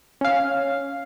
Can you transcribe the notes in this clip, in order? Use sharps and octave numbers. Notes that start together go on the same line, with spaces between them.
C#4 F5